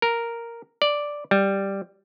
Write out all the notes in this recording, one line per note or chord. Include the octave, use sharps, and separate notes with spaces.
A#4
D5
G3